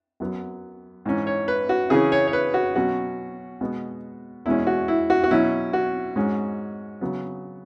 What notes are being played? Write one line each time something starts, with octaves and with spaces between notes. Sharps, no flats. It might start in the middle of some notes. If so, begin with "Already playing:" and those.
F#2 F#3 B3
G#2 E3 C#4
C#5
B4
F#4
C#3 E3 C#4 G#4
C#5
C#5
B4
F#4
B2 F#3 C#4 F#4
B2 G#3 B3
E2 B2 G#3 C#4 E4
F#4
E4
F#4
F#4
B2 F#3 C#4 E4
F#4
G#2 G#3 C#4
C#3 F#3 B3